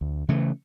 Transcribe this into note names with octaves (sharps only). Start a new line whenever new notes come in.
D2
C#3 E3 A3